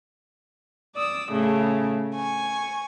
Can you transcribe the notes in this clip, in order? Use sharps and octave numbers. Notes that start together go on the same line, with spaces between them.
D5 D#6 E6
A2 C#3 A3
G#5 C#6